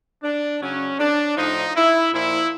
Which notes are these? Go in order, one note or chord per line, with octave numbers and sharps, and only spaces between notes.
D4
C#3 F#3 C#4
D4
A2 F3 D#4
E4
A#2 F3 E4